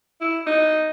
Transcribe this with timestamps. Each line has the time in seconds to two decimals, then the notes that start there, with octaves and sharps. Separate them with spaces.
0.21 E4
0.46 D#4